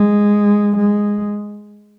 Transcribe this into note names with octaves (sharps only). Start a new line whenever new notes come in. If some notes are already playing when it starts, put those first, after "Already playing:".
Already playing: G#3
G#3